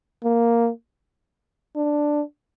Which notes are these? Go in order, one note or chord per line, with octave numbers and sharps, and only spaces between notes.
A#3
D4